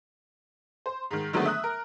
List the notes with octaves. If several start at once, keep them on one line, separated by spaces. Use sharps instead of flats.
C5
G#2 D#3
D3 D#3 F#3 G#3 A3 B3
E5 D#6 F#6
A#4